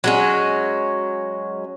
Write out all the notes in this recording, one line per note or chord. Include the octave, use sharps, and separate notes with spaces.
F#3 G#3 C#4